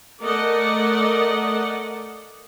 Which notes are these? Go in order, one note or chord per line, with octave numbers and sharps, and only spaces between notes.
A3 A#4 D5 D#5 F#5